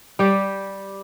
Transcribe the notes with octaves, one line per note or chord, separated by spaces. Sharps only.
G3 G4